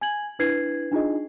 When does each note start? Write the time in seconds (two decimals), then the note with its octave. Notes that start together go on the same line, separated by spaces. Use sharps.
0.01 G#5 G#6 F#7
0.39 D4 E4 B4 G#6 C7
0.92 D4 D#4 F4 G#4 D#5